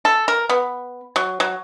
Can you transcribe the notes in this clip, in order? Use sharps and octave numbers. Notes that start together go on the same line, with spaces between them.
A4
A#4
B3
F#3
F#3